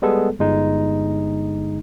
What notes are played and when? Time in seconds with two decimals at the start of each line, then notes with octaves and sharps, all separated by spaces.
0.02 G3 G#3 B3 G#4 A4
0.39 G1 G#3 D#4